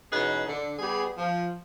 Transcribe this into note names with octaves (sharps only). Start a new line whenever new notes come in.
B2 E3 C#4 D#4 G#4 B4
D3
G3 B3 G4 G#4
F3